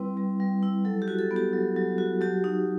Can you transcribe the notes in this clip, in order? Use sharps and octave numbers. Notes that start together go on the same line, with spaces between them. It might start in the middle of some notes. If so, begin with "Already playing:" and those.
Already playing: G3 C4 E4 B4
G3
G3
E4
F#3 A4
G4
F#4
A4
B3
G4
F#3
F#3
F#4
F#3 G4
D#4